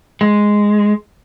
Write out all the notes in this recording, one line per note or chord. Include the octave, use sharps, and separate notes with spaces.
G#3